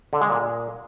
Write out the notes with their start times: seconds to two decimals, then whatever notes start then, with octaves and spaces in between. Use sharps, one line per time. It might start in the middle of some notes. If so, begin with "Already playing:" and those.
0.13 D3
0.21 G#3
0.30 A#2